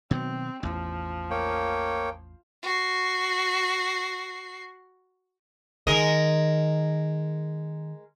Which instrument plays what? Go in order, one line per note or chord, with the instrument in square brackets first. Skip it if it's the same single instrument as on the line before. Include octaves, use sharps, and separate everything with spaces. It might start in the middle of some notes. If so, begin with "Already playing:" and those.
[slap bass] B2 D#3 F#3 [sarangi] C4
[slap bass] A1 E2 [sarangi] F3
[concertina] A#3 C#5 G5
[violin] F#4 C7
[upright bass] D#3 [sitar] G#3 A#4 D#5